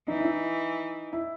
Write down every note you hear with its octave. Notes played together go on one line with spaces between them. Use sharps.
E3 D#4
E4
D#4
E4